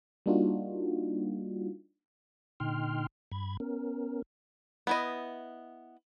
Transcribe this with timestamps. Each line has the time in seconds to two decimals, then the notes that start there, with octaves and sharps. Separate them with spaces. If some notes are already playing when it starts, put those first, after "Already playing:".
0.26 G3 A#3 D4 D#4 F4 F#4
2.60 A#2 D3 D#4 G5 C6 F6
3.32 G2 B5 G#6
3.60 B3 C#4 A#4
4.87 B3 E4 D#5